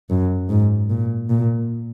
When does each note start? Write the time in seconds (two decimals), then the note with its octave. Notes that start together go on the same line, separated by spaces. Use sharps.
0.10 F#2
0.50 G#2
0.90 A#2
1.30 A#2